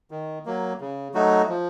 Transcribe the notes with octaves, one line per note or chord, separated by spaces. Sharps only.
D#3
F#3 A#3
C#3
F#3 A3 D#4 F#4
F3